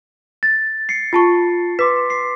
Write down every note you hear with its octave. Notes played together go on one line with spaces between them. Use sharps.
A6
C7 C#7
F4 A5 C#6
B4 C6 D6 B6
C7